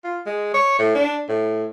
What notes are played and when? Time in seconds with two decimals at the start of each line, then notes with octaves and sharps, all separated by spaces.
0.04 F4
0.26 G#3
0.54 C#5
0.79 A2
0.95 D4
1.29 A2